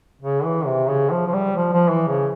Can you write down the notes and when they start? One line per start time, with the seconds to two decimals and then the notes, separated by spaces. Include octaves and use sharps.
0.22 C#3
0.44 E3
0.66 C3
0.88 C#3
1.11 F3
1.27 F3
1.33 G3
1.56 F3
1.73 F3
1.90 E3
2.08 C#3